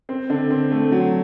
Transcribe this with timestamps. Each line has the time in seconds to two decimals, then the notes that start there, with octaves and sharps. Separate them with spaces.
0.09 C4
0.30 D3
0.51 C4
0.71 A3
0.92 F#3